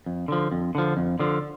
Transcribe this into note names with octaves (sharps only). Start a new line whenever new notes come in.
F2
D3 F3
F2
D3 F3
F2
D3 F3